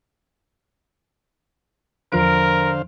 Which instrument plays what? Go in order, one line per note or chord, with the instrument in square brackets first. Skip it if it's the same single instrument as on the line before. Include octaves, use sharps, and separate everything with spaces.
[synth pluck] E2 F3 D7 [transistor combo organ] D3 C5 F5 [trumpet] A#4